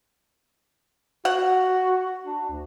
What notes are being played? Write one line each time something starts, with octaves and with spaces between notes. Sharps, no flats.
F#4 F#5
D4
D2